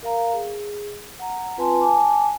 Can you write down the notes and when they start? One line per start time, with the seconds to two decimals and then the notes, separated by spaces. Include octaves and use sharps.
0.03 A#4 F5 A#5
0.33 G#4
1.19 F#5 A#5
1.57 C4 F4 B4 G#5 A5 C6
1.81 G#5 A5 D6